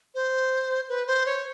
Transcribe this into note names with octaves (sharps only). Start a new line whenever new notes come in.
C5
B4
C5
C#5